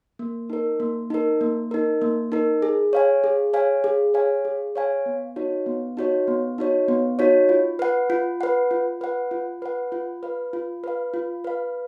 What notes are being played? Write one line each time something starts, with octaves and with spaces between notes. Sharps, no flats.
A#3
D#4 A#4
A#3
D#4 A#4
A#3
D#4 A#4
A#3
D#4 A#4
G#4
C#5 F5 G#5
G#4
C#5 F5 G#5
G#4
C#5 F5 G#5
G#4
C#5 F5 G#5
B3
D#4 F#4 C#5
B3
D#4 F#4 C#5
B3
D#4 F#4 C#5
B3
D#4 F#4 C#5
F4
B4 F#5
F4
B4 F#5
F4
B4 F#5
F4
B4 F#5
F4
B4 F5
F4
B4 F5
F4
B4 F5